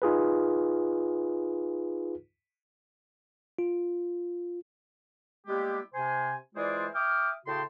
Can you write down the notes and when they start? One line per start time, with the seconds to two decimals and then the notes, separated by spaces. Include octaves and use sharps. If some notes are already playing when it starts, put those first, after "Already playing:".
0.02 D#4 F4 G#4 B4
3.59 F4
5.47 G3 G#3 A#3 B3 E4 G4
5.94 C3 C5 G#5
6.55 E3 G#3 F4 G#4 C5 D5
6.94 E5 G5 D6 D#6 F6
7.46 A2 C#3 F#4 G5 A5 C6